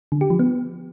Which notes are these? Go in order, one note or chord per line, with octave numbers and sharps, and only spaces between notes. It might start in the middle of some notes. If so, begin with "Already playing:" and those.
D3
G4
F3
B3